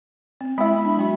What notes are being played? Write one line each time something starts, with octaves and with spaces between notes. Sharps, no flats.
C4
G#3 B3 E4 E5 B5
D4
F#3 B3 F#4